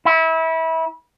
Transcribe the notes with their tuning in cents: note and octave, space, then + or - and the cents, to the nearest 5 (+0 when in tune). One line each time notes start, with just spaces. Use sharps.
E4 -25